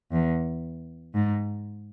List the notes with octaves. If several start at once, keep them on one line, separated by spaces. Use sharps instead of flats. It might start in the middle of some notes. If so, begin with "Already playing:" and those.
E2
G#2